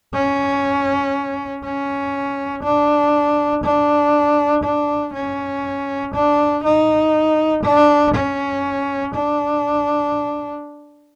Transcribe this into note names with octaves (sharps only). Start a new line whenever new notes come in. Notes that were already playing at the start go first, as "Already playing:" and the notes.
C#4
C#4
D4
D4
D4
C#4
D4
D#4
D4
C#4
D4